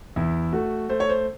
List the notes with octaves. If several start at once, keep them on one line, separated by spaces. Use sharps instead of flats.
E2 E4
A3 F#4
A3 C5
C#5
C5